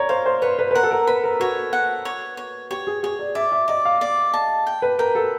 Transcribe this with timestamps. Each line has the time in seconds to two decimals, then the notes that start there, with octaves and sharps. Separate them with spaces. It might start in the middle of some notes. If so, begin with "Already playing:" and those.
Already playing: A#4 C#5 D5
0.09 C5 F5
0.26 C5
0.42 B4 C#5
0.59 B4
0.71 B4
0.75 A#4 F#5
0.83 A4
0.91 A#4
1.07 B4 B5
1.24 A#4
1.40 F#4 C#5
1.73 F#5
2.05 C#5
2.37 C#5
2.70 G4 C#5
2.87 G#4
3.03 G#4 C#5
3.19 D5
3.35 D5 E5
3.52 E5
3.68 D5 D#5
3.85 F5
4.01 D5
4.34 A5
4.67 G5
4.82 B4
4.99 A#4 G5
5.15 A4